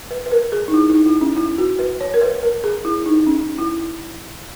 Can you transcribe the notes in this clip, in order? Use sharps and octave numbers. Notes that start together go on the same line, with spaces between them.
B4
B4
A#4
G#4
D#4
E4
D#4
E4
C#4
E4
F#4
B4
C#5
A#4
B4
A#4
G#4
E4
D#4
C#4
E4